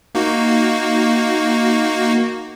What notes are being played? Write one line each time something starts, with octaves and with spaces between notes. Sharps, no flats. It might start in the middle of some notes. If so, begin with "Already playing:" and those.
A#3 D#4 F#4